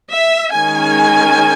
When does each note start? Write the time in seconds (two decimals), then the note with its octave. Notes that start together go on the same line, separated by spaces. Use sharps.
0.09 E5
0.51 D#3 G#3 C#4 G#5